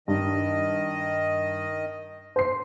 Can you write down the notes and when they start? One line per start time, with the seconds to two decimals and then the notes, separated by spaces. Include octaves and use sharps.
0.08 G2 D#3 D#5
2.36 C5 C7